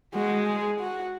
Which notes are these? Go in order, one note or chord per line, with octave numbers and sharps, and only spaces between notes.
G#3 F#4
G#4
F#4